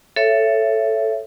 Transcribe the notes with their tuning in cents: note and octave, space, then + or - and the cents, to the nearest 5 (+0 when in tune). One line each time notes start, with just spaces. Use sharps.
A4 +0 C#5 +0 E5 +20